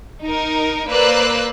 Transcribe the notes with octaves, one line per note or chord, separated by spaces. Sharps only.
D#4 A#4
A#3 B4 C5 D5 E6 F#6